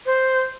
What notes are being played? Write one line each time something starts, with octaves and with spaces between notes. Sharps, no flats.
C5